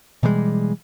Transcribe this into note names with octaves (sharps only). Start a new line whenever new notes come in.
B2 E3 G3 G#3